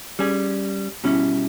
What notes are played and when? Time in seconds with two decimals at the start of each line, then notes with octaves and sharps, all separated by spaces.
0.19 G3 C#4 G#4
1.04 B2 G3 C#4 E4